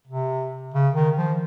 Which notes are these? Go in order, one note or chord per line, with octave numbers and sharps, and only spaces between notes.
C3
C#3
D#3
F3